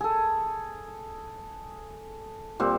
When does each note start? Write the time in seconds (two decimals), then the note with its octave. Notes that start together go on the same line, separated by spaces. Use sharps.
0.01 G#4 A4
2.60 A#2 G3 C4